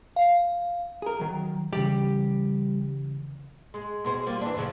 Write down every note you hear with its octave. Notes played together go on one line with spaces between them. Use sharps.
F5
G#4 A#4
D#3 F#3
C#3 E3 G3 G4
G#3
B2 G#3 C5
G3 A#3 F4
E3 D4
A2 C#3 F3